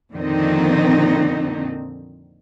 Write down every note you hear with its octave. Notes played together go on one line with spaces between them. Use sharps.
F2 A#2 D3 D#3 C4 D#4